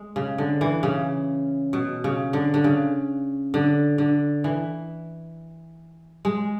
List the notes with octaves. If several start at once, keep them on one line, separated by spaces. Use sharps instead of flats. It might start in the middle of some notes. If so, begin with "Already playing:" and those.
Already playing: G#3
C#3
D3
E3
C#3
B2
C#3
D3
D3
C#3
D3
D3
E3
G#3